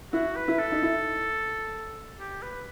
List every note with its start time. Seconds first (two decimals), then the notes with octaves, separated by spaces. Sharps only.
0.13 E4 F#4
0.36 B4
0.48 E4
0.59 A4
0.72 D#4
0.82 E4
2.20 G4
2.43 B4